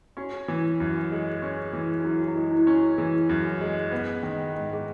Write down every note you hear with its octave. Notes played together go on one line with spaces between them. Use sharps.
C#4 F#4
E3
F#2
G#3
C#4
E3
F#4
F#2 E4
F#4
E4
G#3
E4
C#4 E4
F#4
E3 G#4
F#2
G#3
B3
D#3
G#2
G#4